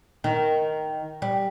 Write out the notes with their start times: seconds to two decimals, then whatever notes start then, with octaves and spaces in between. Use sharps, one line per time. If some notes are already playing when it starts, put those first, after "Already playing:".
0.24 D#3
1.22 G3